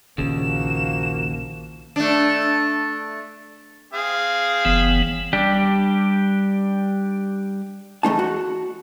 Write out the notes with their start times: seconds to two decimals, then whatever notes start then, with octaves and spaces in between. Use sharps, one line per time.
0.18 A#1 D#2 C#3 F3 A#3 F#4 E7
1.96 A3 D4
3.93 C4 G#4 F5
4.65 F#1 E3 B3
5.33 G3 D4 G4
8.03 E2 A3 D#4 A5
8.19 F#4